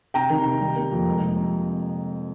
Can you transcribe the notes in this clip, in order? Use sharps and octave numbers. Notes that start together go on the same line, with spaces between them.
C3 G5 A#5
D#3
C3
G3
A#3
F2
G#3
C3